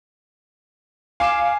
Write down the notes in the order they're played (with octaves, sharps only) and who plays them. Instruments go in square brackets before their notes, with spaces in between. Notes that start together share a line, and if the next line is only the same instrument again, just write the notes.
[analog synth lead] F5 [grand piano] G#5 D6 E7